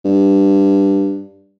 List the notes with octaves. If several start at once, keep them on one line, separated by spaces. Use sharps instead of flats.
G2